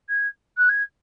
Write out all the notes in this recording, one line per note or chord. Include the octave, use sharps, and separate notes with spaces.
G#6
F#6
G#6